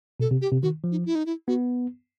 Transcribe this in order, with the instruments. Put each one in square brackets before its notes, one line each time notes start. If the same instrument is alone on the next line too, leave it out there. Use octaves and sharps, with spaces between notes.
[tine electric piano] B2 [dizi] A4
[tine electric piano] C3
[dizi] G4
[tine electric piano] C3
[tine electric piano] D#3 [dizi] F#4
[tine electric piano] F3
[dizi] D#4
E4
D#4
E4
[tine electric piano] B3 [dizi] F#4